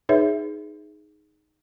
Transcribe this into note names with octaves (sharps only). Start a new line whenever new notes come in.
D#4 G#4 B4 C#5 E5